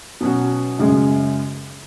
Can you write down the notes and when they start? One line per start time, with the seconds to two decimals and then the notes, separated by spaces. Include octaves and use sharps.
0.20 B2 F#3 C#4 F#4
0.79 F#2 C#3 G#3